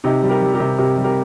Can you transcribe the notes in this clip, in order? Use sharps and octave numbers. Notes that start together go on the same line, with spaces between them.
C3 D#4 G4
G3
G4 A#4
G3
G4 A#4
C3
C3 G4 A#4
G3
G4 A#4